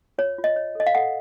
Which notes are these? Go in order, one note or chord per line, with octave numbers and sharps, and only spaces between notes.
F4 C#5
F4
D#5
C#5
A4 D#5
F5
A4 F#5